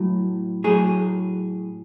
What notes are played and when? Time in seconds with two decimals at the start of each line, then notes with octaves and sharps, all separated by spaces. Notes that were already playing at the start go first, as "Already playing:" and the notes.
Already playing: A2 F#3
0.64 A2 F#3 G#4